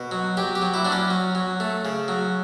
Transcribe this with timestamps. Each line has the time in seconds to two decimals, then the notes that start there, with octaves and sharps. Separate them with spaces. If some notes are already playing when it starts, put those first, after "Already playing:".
Already playing: B2
0.11 F#3
0.37 F#3 G4
0.55 G4
0.62 F#3
0.74 E4
0.85 F#3 D4
0.92 C#4
1.11 F#3
1.35 F#3
1.60 A3
1.85 C#3
2.08 F#3